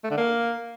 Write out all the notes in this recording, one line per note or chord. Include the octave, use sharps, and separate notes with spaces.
A3
D3
A#3